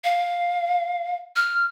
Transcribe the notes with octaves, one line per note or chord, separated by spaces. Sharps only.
F5
F6